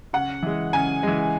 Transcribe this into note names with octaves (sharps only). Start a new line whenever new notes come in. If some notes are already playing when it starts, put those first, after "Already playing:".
C#3 F#5
E3 G#3
C#3 G#5
E3 G#3